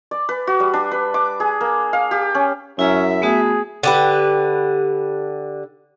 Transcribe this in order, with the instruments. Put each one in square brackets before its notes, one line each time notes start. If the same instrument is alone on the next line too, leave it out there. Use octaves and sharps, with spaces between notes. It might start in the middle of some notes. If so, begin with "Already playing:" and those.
[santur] D5
B4
F#4
G3
D4
B4
D6
G#4
A#3
F5
G4
C#4
[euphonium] F#2 [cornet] C#4 [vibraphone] E4 A#5 E6 [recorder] E5
[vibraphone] A3 B3 F#4 [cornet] G#4
[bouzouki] D3 G4 B4